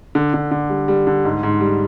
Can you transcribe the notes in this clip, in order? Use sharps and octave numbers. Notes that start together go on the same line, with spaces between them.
D3
D3
D3
G3
G3
D3
G#2
G#2
G3